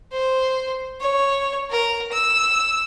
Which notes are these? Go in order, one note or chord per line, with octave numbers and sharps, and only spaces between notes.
C5
C#5
A#4
E6